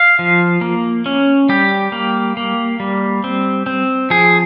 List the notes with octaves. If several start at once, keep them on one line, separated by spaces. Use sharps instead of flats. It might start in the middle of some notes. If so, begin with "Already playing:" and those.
Already playing: F5
F3
A#3
C#4
G3 G4
A#3
A#3
G3
C4
C4
F3 G#4